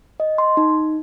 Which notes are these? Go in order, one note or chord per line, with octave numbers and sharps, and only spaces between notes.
D#5
C6
D#4